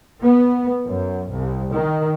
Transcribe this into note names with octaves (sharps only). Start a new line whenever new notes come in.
B3
F#2
C2
D#3